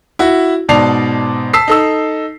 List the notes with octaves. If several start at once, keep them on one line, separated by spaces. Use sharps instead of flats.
E4 F#4
G#2 B2 D5 A5 C7 F7
A5 E6 B6 C7
D#4 A4 E6